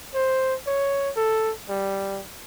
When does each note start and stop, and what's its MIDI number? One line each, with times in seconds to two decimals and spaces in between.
0.14 0.55 72
0.66 1.10 73
1.16 1.52 69
1.69 2.22 55